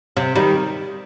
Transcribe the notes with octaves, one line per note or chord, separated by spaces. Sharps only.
C3
D#3 G3